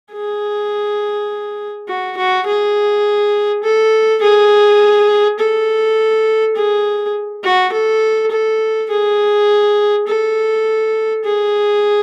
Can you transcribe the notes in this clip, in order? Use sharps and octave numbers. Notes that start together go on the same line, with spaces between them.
G#4
F#4
F#4
G#4
A4
G#4
A4
G#4
F#4
A4
A4
G#4
A4
G#4